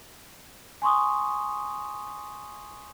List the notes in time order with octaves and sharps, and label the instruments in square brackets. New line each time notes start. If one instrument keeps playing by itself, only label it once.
[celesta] G#5 C6 C#6 D#6